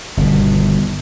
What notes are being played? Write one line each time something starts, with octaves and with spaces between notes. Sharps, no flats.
G1 D#2 B2